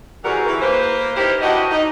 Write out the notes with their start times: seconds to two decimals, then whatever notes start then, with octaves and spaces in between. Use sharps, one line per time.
0.24 C3 E3 G3 F#4 G#4 A#4
0.47 E3
0.61 A#3 B4 C5
1.16 D#4 E4 G4 A#4 C5
1.42 D4 E4 F#4 G4 D#5
1.71 D#4